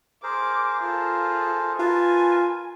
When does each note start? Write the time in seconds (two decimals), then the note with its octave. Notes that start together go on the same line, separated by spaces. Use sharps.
0.23 G#4 A#4 C5 D6
0.79 F4 A4
1.79 F4 A#4 B4 G#5 A5